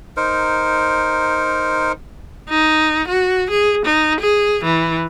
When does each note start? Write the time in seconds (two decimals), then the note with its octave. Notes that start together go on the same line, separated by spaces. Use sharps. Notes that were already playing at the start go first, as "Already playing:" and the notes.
0.17 D#4 A#4 C5
2.49 D#4
3.08 F#4
3.50 G#4
3.86 D#4
4.20 G#4
4.64 E3